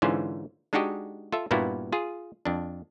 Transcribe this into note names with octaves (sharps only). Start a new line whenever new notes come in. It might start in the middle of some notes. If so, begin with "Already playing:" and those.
G#2 D3 E3 C#4 F4 C5
G#3 D4 D#4 F#4 G4 D#5
F4 A4 E5
G2 A#2 A#3 B3 E4 F#4
F4 G#4
F2 D4